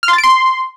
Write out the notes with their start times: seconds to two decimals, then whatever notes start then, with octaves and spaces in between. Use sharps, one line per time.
0.03 F6
0.08 C6
0.13 A6
0.18 D7
0.23 C6